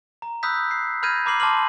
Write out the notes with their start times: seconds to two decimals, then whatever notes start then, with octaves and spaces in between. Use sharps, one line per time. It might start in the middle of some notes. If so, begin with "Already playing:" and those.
0.22 A#5
0.43 B5 D#6 E6 F#6 G6 B6
0.71 C7
1.03 B5 F6 G6 G#6 A#6 D#7
1.25 A#5 B5 D6 F6 C7 F#7
1.40 A5 C6 D6 F6 F#7